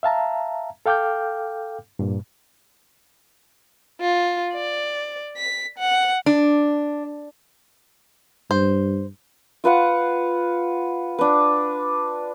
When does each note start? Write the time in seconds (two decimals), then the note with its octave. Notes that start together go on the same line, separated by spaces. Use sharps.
0.03 E5 F5 A5 A#5
0.86 A4 F5 G5 D6 F6 G6
1.99 G2 A#2
4.00 F4
4.53 D5
5.37 B6
5.78 F#5
6.26 D4
8.51 G2 C5
9.64 F4 B4 F5 F#5
11.19 D4 B4